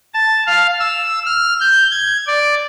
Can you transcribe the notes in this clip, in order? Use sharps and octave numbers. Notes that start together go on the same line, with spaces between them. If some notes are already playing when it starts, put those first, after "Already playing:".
A5
F5
E6
F6
G6
G#6
D5